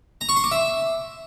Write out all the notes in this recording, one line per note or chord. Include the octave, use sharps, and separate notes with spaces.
A#5
C#6
C6
D6
E5